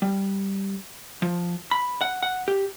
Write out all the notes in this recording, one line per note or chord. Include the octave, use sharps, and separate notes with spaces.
G3
F3
B5
F#5
F#5
G4